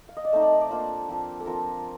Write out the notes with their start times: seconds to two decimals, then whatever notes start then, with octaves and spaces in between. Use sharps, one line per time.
0.09 F5
0.17 D#5
0.25 D5
0.33 A3 C4 D#4 C5
0.42 D5
0.53 D#5
0.61 D5
0.71 A#3 D4 F4 C5
1.09 F3 C4 F4
1.40 A4
1.46 F3 C4 F4 A#4